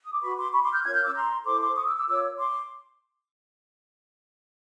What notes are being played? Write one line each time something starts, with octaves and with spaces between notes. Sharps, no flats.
D#6
D6
F#4 B4 B5 C#6
C6 D6
B5 C#6
C6 D6
F6 G6
C#4 F4 A#4 C#5 F#6 G#6
F6 G6
D6 E6
A#5 C6
E4 A4 C5 C6 D6
C6 D6
C#6 D#6
D6 E6
D6 E6
F4 A#4 C#5 D6 E6
C6 D6